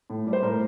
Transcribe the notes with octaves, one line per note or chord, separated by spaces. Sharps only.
A2
G3
C5
A2 A#4